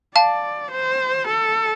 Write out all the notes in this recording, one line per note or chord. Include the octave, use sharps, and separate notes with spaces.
D5 F5 A5
C5
A4